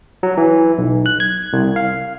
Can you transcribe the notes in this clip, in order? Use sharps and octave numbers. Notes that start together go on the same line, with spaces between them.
F#3
E3
B1
F#6
G#6
C2
F5